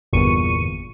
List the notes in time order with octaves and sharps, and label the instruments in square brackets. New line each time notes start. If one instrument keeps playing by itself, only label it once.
[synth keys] G1 E2 A#2 C#6 C#7 D#7